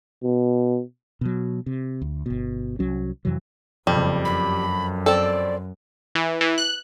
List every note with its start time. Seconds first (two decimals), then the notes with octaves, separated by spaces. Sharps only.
0.24 B2
1.21 B2 F#3
1.66 C3
2.02 D2
2.26 G1 B2
2.79 C2 F#3 C#4
3.25 F2 C3 E3 F#3
3.87 F#1 F2 C#3 G3
4.25 F#2 B5
5.06 C4 A4 D5
6.15 E3
6.41 E3
6.58 F#6